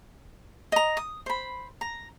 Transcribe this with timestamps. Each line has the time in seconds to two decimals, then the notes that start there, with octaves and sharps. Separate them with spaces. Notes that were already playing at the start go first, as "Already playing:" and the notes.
0.72 D#5 A#5
0.97 D#6
1.26 C5 B5
1.81 A#5